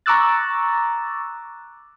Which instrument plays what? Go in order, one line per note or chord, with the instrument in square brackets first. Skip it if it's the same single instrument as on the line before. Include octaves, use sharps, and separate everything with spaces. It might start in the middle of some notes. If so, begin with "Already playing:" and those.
[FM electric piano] A#5 C#6 D6 E6 F#6 A6